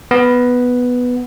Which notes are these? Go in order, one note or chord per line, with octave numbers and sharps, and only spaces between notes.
B3